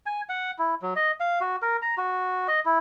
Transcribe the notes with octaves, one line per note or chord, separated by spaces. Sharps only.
G#5
F#5
E4
F#3
D#5
F5
F#4
A#4
A#5
F#4
D#5
E4